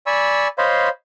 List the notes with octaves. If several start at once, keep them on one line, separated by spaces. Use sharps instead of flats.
D5 G#5 B5 C#6 E6
C5 C#5 D#5 F5 B5 C6